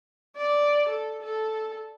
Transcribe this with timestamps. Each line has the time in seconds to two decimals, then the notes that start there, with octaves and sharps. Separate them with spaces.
0.37 D5
0.88 A4
1.22 A4